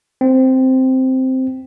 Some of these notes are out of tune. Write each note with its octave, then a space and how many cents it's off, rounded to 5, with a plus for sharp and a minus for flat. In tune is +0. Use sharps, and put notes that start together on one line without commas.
C4 -5